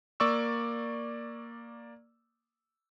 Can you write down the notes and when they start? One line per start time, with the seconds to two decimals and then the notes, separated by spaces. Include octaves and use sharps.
0.20 A#3 D5 C#6 E6